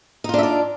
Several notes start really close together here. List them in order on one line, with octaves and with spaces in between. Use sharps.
D#4 F4 D4 E5 D5